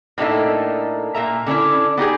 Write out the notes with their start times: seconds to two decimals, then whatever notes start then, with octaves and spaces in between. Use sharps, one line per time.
0.18 A2 A#3 D4 D#4 A4 E5
1.15 A#2 A#3 E5 A#5
1.46 D3 C#4 D4 E4
1.97 B3 D#4 G4 G#4